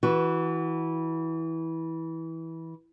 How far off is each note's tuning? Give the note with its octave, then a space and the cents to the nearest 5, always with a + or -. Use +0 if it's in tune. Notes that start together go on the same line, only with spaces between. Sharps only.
E3 -15 F#4 +0